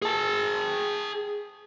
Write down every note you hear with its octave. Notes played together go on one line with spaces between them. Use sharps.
G#4 A5